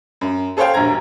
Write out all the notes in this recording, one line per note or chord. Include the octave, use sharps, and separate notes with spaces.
F#2
G#4 A4 C5 C#5 F5 G5
E1 A#1 G2 A#5 G#6